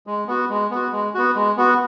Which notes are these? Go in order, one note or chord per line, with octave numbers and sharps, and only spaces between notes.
G#3
B3 F#4
G#3
B3 F#4
G#3
B3 F#4
G#3
B3 F#4